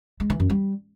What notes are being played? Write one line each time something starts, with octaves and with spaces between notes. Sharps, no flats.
G#3
E3
F#2
G3